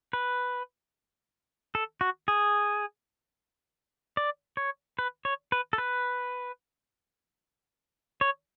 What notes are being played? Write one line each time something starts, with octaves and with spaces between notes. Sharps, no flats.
B4
A4
F#4
G#4
D5
C#5
B4
C#5
B4
A4
B4
C#5